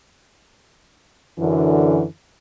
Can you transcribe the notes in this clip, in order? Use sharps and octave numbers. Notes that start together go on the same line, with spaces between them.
F#2 D3 E3